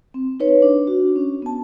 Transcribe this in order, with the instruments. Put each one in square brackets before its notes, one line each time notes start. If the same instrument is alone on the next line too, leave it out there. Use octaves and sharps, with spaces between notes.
[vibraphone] C4
D#4 B4 C#5
D4
F#4
C#4
B3 A5